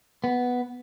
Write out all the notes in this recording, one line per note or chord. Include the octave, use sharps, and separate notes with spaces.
B3